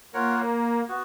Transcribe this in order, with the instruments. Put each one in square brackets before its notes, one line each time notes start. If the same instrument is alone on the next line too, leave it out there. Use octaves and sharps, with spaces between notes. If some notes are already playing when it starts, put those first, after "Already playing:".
[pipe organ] A#3 [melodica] F4 A#4 C#5 F#5
[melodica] B3 F#4